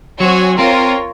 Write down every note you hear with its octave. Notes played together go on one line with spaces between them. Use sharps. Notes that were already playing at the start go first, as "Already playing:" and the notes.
F#3 C4 F#4 C#5 G#5
C4 F4 A#4 C#5